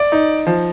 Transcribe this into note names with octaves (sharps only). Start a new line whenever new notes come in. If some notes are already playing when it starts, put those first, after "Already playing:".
Already playing: D5
D#4
F3